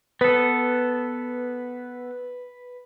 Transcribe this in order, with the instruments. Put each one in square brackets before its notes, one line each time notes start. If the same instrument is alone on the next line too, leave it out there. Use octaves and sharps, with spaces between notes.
[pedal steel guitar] B3 A4 [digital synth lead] B4